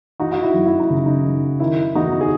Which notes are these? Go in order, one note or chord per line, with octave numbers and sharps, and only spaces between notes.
E3 D#4 F#4
F#4
E4
F#2
E4
D#4
C#3
D#4
F#2
D#3 E4
E2 D#4 F#4
G#4